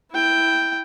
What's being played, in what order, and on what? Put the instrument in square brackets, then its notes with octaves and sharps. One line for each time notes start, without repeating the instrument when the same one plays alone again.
[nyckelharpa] E4 G5